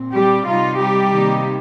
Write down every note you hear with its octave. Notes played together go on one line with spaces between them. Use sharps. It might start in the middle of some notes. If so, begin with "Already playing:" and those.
Already playing: A#2 C4
G3 G4
C3 G3 D#4 F4
G3 G4
C3 D#3 A#3 D#4